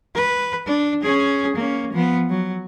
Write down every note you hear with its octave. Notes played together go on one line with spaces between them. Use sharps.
B4
D4
C#4 G#4
A#3 C#4
F3 B3
F#3